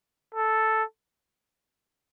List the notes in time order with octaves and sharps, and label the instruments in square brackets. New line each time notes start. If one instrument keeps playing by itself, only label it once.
[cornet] A4